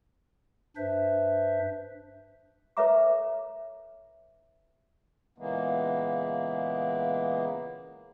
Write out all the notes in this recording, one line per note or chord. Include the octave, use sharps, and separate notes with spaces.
G2 D4 B4 C5 E5
A4 B4 C#5 E5 A#5 D6
A#2 C#3 E3 G#3 A#3 B3